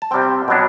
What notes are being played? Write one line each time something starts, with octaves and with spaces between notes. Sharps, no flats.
A5
C3 G3 C4 G5
B2 F#3 B3 D4